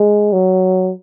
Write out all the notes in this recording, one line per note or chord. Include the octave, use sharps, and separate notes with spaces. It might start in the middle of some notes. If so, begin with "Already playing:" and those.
Already playing: G#3
F#3